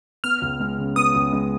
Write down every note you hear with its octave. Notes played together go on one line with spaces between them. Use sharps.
B3 F6
C#2
G#3
C#3
B3 D#6
C#2
G#3